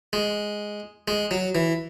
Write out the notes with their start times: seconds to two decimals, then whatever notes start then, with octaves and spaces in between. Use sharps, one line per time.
0.13 G#3
1.08 G#3
1.31 F#3
1.55 E3